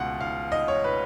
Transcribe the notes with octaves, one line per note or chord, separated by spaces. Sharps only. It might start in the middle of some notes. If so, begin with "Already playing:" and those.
Already playing: C#2 B2 F#5
F5
D#5
C#5
B4